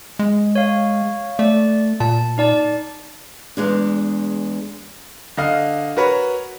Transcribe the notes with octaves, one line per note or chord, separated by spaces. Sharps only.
G#3
C#5 F5
A3 D5
A#2 A5
D#4 D5 A5
E2 G#3 D4
D3 D#5 F5
F#4 A#4 B4 C#5